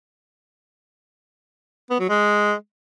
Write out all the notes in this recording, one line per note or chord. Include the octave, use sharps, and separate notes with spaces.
B3
F#3
G#3